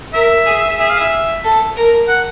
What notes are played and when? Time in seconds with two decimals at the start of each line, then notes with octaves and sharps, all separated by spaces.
0.13 A#4 E5
0.46 G#4
0.79 G#4 E5
0.90 F5
1.01 E5
1.44 A4
1.76 A#4
2.08 F#5